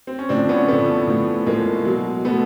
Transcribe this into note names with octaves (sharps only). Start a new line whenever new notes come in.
C4
C#4
A2 F3 C4 D4
B3 C#4
A2 F3 A3 B3
A2 F3
A2 F3 G#3 A#3
B2 F#3
B2 F#3 A3 B3